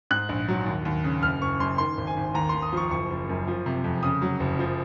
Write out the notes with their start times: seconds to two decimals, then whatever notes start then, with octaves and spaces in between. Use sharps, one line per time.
0.11 G#2 F#6
0.29 A#1
0.48 F#3
0.66 D#2
0.85 D#2
1.04 C#3
1.23 F#1 F6
1.42 F#1 C#6
1.60 F#2 C6
1.78 D#3 C6
1.97 G#1
2.07 G#5
2.17 G#1
2.34 D#2 A#5
2.49 D#2 C6
2.62 D#6
2.73 F3 C#6
2.91 F#1 C#6
3.10 F#1
3.29 F#2
3.47 F3
3.66 C3
3.84 F2
4.03 C#3 D#6
4.22 F#3
4.40 F#1
4.59 F3